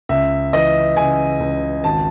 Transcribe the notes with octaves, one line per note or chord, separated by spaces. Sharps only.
C#2 E5
E3 D#5
C#3 G#5
C#2
G#1 A5